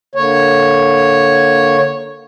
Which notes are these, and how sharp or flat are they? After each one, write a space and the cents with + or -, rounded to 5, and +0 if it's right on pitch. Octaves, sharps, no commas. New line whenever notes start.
D3 +0 A#3 +0 C#5 -5